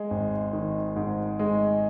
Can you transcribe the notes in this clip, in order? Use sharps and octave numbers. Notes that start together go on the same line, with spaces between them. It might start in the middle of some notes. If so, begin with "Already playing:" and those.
Already playing: G#3
G#1
D#3
G#2
G#3